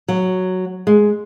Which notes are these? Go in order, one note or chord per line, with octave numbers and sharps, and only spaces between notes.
F#3
G#3